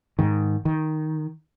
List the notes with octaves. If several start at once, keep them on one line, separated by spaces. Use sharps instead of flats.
G#2 D#3
D#3